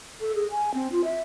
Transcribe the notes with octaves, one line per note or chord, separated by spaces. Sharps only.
A4
G#4
G#5
C4
F4
E5